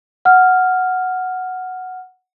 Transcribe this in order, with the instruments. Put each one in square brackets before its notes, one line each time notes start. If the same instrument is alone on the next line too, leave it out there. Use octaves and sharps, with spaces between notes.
[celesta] F#5 F6